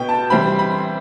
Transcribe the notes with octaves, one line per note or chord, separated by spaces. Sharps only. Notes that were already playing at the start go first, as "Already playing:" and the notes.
Already playing: B2 B3 G5
A5
C3 E3 G3 C4 B5
B5